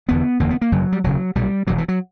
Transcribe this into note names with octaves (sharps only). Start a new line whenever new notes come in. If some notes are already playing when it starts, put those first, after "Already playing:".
E1 E2 D3 B3
F#1 E2 D3 A#3
B3
A#3
G1 F#2 C#3 F#3
G3
E1 D2 C#3 F#3
B1 A#2 G3
E1 E2 B2 F#3
E3
F#3